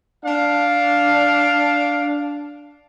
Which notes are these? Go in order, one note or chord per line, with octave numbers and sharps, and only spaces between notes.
D4 F5